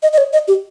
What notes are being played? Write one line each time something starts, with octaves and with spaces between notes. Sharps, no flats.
D#5
D#5
C#5
D#5
G4